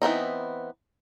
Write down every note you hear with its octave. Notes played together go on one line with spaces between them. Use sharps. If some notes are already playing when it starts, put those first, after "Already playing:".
E3 B3 C4 D#4